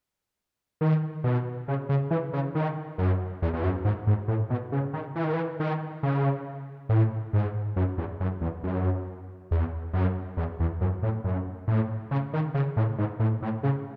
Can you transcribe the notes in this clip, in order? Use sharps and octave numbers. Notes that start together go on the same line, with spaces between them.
D#3
B2
C#3
C#3
E3
C#3
D#3
F#2
E2
E2
F#2
G#2
G#2
A2
B2
C#3
D#3
E3
D#3
E3
D#3
C#3
A2
G#2
F#2
E2
F#2
E2
F#2
E2
F#2
E2
E2
F#2
A2
F#2
A2
C#3
D#3
C#3
A2
G#2
A2
A2
C#3